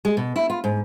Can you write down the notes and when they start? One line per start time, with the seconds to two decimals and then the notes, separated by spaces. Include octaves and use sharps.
0.05 G#3
0.17 B2
0.36 E4
0.50 F4
0.64 G#2